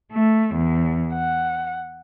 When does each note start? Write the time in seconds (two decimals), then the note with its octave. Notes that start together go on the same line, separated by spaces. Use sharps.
0.12 A3
0.56 E2
1.13 F#5